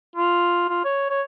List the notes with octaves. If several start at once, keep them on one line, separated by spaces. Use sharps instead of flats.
F4
F4
C#5
C#5